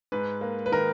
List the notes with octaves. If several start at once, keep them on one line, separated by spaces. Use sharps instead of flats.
G#2 B4
A#3
B4
D#3 A#4